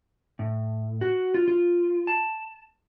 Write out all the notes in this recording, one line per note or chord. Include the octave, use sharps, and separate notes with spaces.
A2
F#4
F4
F4
A5